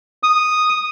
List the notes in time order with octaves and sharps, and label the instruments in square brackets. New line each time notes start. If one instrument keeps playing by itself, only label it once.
[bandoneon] D#6